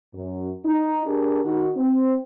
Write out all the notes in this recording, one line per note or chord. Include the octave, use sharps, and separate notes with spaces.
F#2
D#4
D4 G4 G#4 A#4
D#3 D#4 F#4
C4